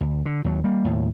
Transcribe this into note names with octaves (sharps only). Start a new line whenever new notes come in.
D2
D3
D#2 F#3
G3 A#3
D#2 A2